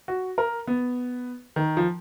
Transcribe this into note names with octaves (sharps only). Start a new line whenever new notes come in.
F#4
A#4
B3
D#3
F3